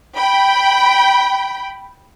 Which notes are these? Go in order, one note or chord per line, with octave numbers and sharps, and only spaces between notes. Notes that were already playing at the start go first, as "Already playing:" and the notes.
G5 B5